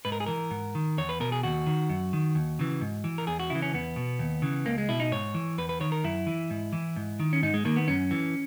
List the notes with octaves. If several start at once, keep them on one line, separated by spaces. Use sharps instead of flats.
G#2 B4
A#4
G#4
E3 A#4
G#2
D#3
E2 C#5
B4
B2 A#4
G#4
D#2 F#4
D#3
F#2
D#3
D#2
C#3 E3
G#2
E3
A#4
E2 G#4
F#4
C#3 E3 E4
C#4
E2 B3
B2
D#2
C#3 E3
C#2 A#3
G#3
B2 E4
D#4
G#2 C#5
E3
E2 B4
B4
D#3 C#5
A#4
F#2 E4
E3
G#2
E3
G#2
D#3
C#4
G#2 D#4
G#3
D#3 A#3
B3
F#2 C#4
E3